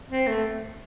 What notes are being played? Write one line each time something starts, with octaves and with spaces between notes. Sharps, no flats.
C4
A3